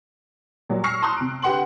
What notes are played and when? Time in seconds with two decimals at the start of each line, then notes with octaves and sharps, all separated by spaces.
0.69 A#2 F#3 G3
0.84 C#6 E6 F6 A#6 C7 C#7
1.02 A5 A#5 C6 C#6 D#6 F#6
1.17 C3 D7
1.42 D3 G4 B4 F#5 C6 F#7